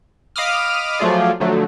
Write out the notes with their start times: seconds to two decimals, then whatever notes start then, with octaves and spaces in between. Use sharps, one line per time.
0.36 D#5 F5 B5 D6 D#6 F6
0.99 F3 F#3 A3 F4 G#4 D5
1.40 D3 F3 F#3 A3